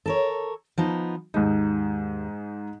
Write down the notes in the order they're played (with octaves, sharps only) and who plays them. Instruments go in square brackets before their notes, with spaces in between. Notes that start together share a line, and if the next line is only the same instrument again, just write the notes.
[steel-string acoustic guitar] A4 A#4 C#5
F3 B3 D#4
[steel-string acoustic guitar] D#2 [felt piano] G#2 D#4